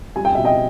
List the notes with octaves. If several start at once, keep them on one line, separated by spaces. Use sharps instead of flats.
G3 G#5
G5
B2 E5
D#5 G5